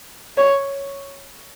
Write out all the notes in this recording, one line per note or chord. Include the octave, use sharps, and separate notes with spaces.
C#5